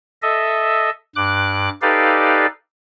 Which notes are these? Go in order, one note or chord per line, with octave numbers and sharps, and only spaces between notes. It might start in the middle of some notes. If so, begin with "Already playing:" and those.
A4 D#5 E5
G2 D6 F#6
D#4 G4 A4 B4 D5 F5